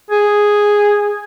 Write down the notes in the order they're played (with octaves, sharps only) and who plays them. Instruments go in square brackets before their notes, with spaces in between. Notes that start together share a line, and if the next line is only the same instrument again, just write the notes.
[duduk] G#4